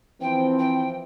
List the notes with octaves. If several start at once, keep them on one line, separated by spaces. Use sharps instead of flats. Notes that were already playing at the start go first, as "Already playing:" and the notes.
E3 F3 C4 G5
G5